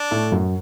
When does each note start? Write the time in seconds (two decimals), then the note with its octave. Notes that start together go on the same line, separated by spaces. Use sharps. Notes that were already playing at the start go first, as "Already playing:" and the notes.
Already playing: D4
0.11 A2 A3
0.32 F#2 F#3